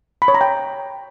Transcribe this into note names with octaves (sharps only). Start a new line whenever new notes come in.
B5
C#5
A#5
G5